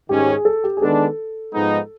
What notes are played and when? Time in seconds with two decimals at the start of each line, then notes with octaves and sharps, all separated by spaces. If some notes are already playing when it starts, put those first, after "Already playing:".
0.09 G#2 D#3 G#3 C#4 G4
0.28 G#4
0.45 A4
0.64 G4
0.77 G#4
0.82 D#3 G#3 B3 D4 A4
1.54 G#2 F3 G#3 B3 D#4